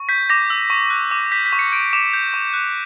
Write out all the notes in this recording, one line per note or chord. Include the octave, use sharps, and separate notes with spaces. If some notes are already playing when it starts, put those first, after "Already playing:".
Already playing: C#6
G6 B6
D6 A#6
E6
C#6
F#6
D6
G6 B6
B6
C#6
C#7
G6 D7
D6 E7
G6
C#6
F#6